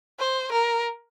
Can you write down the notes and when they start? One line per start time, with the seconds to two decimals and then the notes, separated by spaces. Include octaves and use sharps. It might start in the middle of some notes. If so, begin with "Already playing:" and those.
0.19 C5
0.52 A#4